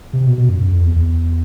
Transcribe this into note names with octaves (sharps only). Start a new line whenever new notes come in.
C3
B2
B2
F#2
F#2
F2
E2
E2